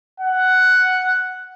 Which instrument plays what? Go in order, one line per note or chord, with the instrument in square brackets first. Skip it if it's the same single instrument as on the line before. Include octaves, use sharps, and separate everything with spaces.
[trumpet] F#5